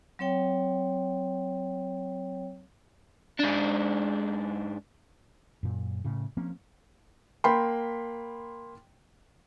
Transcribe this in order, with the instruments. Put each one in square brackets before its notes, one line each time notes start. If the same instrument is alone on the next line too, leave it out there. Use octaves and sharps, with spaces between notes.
[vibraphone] F#3 C4 C#5 G5
[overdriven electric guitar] G#2 D4
[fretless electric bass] F#2 A#2
A2 C#3
F3 A#3 C4 C#4
[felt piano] A#3 G5 B5 C6